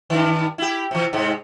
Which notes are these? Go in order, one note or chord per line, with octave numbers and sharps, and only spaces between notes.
G2 D#3
E4 G4
C3 E3
G#2 C3 G#3